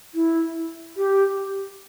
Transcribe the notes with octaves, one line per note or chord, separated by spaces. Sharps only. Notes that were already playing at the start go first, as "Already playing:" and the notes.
E4
G4